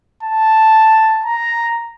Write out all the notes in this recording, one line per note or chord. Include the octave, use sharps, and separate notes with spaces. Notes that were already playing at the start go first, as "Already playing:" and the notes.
A5
A#5